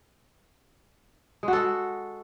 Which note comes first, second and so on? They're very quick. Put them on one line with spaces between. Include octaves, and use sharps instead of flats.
G#3 F#4 A4